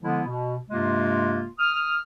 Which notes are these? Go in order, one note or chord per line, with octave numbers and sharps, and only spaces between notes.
D3 F3 G#3 B3 E4
B2
G2 C3 G#3 A#3 F4
D#6 F6